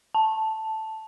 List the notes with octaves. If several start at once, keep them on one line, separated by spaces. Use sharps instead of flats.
A5